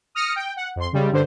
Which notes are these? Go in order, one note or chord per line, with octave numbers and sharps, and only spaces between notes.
D#6 F6 A#6 C#7
G5
F#5
F2 C6
C#3 G3 G#3
G2 D3 C5